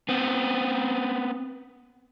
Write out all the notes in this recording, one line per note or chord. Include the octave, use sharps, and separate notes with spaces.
B3 C4